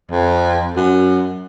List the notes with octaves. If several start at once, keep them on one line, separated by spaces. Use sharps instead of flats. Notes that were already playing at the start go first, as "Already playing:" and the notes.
F2
F#2